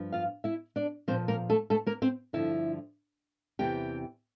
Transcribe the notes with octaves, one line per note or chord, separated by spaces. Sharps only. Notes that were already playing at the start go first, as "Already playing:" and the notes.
Already playing: G2 F3
F4 F5
E4 E5
D4 D5
A#2 F3 C4 C5
A#3 A#4
A3 A4
A3 A4
A#3 A#4
C4 C5
G2 D3 F3 E4 E5
E2 C3 E3 G4 G5